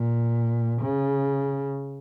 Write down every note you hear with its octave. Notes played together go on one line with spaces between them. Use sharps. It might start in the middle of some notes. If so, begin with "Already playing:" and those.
Already playing: A#2
C#3